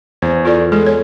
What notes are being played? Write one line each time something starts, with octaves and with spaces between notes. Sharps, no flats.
E2 C5
F4 A4 D5
G#3 A4
C#5